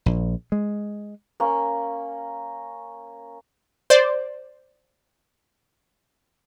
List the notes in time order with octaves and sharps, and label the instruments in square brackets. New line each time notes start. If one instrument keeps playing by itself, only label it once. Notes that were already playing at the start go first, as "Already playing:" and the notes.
[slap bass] A#1
G#3
[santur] A#3 C#4
[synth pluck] C5 D5